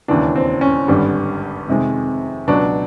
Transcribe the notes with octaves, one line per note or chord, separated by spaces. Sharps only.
E1 D#2 C#3 E3 D4
C4
C#4
G#1 G2 D3 G3
F2 C3 D#3 G#3
C#2 B2 F#3 D4